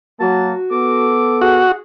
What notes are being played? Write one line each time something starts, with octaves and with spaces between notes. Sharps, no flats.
F#3 A#3 F#4 A5
B3 A4 D6
F#4 G#4